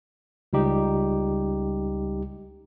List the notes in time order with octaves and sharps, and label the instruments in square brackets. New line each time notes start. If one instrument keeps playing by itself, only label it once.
[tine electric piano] C#2 G3 D#4 G4